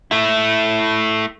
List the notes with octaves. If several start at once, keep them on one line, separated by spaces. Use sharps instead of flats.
A3 E4